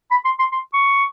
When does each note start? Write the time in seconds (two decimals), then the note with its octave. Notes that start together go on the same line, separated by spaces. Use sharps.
0.11 B5
0.25 C6
0.39 C6
0.52 C6
0.74 C#6